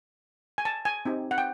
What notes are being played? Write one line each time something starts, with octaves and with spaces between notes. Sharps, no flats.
G#5
A5
G#5
C4 D#4 G4
F#5
G5